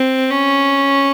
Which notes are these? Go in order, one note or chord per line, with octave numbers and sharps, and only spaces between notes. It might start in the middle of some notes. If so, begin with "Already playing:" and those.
Already playing: C4
C#4